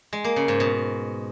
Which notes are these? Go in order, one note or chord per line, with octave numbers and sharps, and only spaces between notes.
G#3
A#3
C#3
G#2
B2